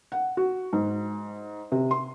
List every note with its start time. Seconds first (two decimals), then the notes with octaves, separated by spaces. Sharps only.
0.12 F#5
0.37 F#4
0.73 G#2
1.72 C3
1.91 C6